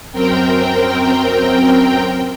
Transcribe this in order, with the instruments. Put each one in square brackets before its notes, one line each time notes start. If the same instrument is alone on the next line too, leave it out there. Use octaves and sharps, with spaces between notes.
[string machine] F#2 C4 A#4 G5